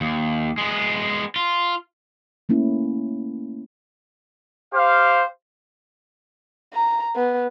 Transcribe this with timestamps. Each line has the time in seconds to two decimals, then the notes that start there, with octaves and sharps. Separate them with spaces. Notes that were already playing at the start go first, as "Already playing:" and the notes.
0.01 D#2
0.58 G#3 B3
1.36 F4
2.49 A3 A#3 C#4 E4
4.73 G4 C5 F5
6.74 A#5
7.16 B3